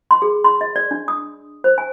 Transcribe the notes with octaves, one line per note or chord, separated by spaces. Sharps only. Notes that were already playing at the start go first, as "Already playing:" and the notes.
C6
G#4
C6
D#5
D5
D4
D#6
C5
G#5